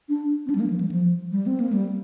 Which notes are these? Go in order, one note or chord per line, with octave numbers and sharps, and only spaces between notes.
D4
C4
D4
G3
A#3
F3
G3
F3
G3
C4
A#3
G3